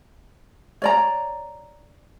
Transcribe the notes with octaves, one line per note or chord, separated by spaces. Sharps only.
C#5 D5 A#5